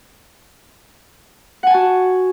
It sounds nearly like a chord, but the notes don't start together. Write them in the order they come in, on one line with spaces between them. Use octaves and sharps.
F#5 G#5 A5 F#4